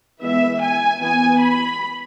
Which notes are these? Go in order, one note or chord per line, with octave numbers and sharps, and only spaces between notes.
E3 G#3 B3 E5
G#5
E3 B3 G#5
B5